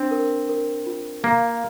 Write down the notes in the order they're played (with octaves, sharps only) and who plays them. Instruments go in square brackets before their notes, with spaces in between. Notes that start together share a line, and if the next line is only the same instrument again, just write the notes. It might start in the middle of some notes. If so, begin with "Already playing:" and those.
Already playing: [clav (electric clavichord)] C4 [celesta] D4
[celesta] A#4
A#4
F4
[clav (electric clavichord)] A#3 [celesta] F5